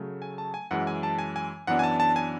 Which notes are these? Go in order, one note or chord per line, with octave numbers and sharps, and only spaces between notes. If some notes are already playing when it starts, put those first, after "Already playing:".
Already playing: C#3 F#3 A3
G#5
A5
G#5
F#2 E3 G#3 F#5
G#5
A5
G#5
G#5
F#2 E3 B3 D4 F#5
G#5
A5
A5
G#5